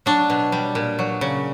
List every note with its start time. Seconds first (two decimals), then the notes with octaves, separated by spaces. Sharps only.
0.06 F#3 D4
0.30 B2
0.52 G3
0.75 A#2
0.99 F#3
1.21 C#3